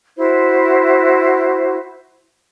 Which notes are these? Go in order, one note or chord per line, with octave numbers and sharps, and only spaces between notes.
E4 F#4 C5